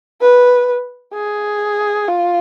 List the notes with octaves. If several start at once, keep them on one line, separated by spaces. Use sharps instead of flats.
B4
G#4
F4